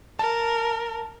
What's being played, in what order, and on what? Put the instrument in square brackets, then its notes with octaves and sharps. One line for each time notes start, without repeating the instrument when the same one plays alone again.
[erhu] A#4 [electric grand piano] A5